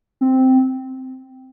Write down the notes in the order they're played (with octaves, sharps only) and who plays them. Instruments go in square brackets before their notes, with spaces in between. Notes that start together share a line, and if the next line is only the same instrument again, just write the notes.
[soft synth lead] C4